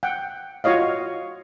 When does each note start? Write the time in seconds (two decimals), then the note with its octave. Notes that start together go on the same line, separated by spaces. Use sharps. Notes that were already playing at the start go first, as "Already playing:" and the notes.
0.03 F#5 G5
0.64 F4 F#4 C#5 D#5 F5